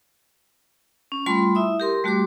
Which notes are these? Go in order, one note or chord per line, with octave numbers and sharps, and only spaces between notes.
C#4
G3 A3 F4 B5 C6
E4 E5 D#6
G4 A#4 C6
G3 A3 F#4 G4 C6 D6